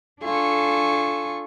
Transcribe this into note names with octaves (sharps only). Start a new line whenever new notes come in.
D4 F4 A4 G#5 C#6